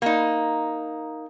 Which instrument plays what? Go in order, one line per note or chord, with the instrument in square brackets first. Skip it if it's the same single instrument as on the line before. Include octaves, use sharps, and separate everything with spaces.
[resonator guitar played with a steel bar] A#3 D#4